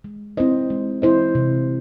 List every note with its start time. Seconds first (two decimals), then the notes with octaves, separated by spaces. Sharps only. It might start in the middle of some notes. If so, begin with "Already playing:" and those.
0.04 G#3
0.37 C4 E4 C5 D#5
0.70 G#3
1.02 C4 E4 C5 D#5
1.35 C3